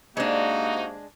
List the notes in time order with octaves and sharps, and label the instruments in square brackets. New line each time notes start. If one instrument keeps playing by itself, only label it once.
[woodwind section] C3 A#3 [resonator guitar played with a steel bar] G#3 D4 [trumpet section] D#4 F#4